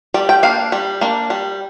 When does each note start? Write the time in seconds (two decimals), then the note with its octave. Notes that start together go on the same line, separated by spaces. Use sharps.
0.14 G3 D5
0.29 G5
0.43 A#3 D4 F5
0.72 G3
1.01 A#3 D4
1.30 G3